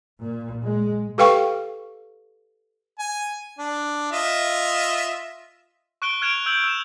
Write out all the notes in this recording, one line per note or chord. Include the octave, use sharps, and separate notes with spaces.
A#2
G#3
G4 A4 B4 F5 G5 C#6
G#5
D4
F4 D#5 E5
C#6 F#6 D7 G7
F6 F#6 G#6 D7 E7 F7
E6 G6 F#7
E6 E7